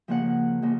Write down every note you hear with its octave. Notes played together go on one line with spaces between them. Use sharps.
C#3 F3 A#3 F#5
C#3 F3 A#3